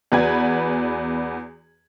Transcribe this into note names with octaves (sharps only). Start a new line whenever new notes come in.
E2 F#4 B4 D5 G#5 G#6